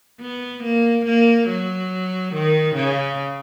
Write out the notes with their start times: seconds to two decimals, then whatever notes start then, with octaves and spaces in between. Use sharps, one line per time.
0.21 B3
0.64 A#3
1.06 A#3
1.48 F#3
2.34 D#3
2.76 C#3